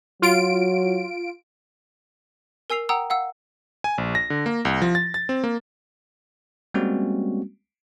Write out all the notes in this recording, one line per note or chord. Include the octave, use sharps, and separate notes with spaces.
F#3 F4 D7
A#4 G#5 E6 C7 F7
F#5 G5 A#5 D#6 E6
F5 F#5 E6
G#5
A#1
A#6
D3
A#3
C2
F3
A6
A6
C4
A#3
G3 G#3 A#3 C4 C#4 F#4